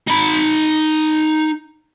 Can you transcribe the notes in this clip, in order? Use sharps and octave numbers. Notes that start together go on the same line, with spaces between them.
D#4 B5